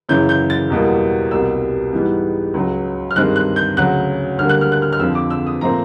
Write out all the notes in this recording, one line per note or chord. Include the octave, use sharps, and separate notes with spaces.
F#2 C#3 E3 G6
G6
A6
E2 B2 G3 A#3
C2 B2 G3 A#3 E6
G#2 E3 G3 B3
C#2 C#3 F#3
F6
G2 D#3 G#3 C4 F#6
F#6
G6
D2 C#3 F#3 F#6
D2 D3 G3 A#3 F6
F#6
F6
F#6
F6
F6
F2 D3 F3 E6
D6
E6
D#6
A#2 F3 A3 C4 A#5